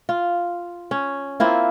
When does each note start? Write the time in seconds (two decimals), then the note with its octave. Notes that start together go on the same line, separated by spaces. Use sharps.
0.09 F4
0.91 C#4
1.40 A#3 C4 E4 F4